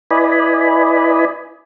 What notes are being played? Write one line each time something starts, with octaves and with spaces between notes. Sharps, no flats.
E4 B4 D5 D#5 G#5 B5